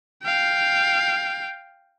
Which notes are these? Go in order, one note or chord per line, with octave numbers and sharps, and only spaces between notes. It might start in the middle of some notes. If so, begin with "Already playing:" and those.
F5 G5